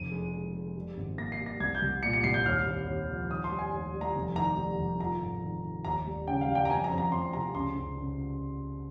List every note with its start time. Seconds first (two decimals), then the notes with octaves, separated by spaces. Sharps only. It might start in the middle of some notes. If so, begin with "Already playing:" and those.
Already playing: F1 D#7
0.12 G#3
0.33 G#3
0.54 G#3
0.76 G3
0.97 G#1
1.18 A#3 A#6
1.32 C7
1.40 G3
1.46 A#6
1.60 C2 G#6
1.75 G6
1.82 C2
2.03 A#2 C#7
2.13 C#7
2.24 C2 C7
2.34 G6
2.45 D#2 F6
2.66 D#2
2.87 D#2
3.09 F3
3.30 D#3 D#6
3.44 C6
3.51 G3
3.59 G#5
3.73 D#2
3.94 G3
4.01 A#5
4.15 F1
4.36 D#3 A#5
4.57 G3
4.79 F1
5.00 F4 A#5
5.21 G#2
5.42 D#3
5.64 D#3
5.85 D#2 A#5
6.07 G3
6.28 C#3 G5
6.41 F5
6.48 G3
6.55 G5
6.65 A#5
6.70 F2 G#5
6.84 A#5
6.92 F2
6.98 A#5
7.12 F2 C6
7.33 C3 A#5
7.54 C#2 C6
7.76 C#2
7.97 C#2